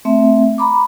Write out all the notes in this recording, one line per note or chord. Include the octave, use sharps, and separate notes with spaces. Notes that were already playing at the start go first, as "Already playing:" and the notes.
A3 C4 E5
A#5 B5 D6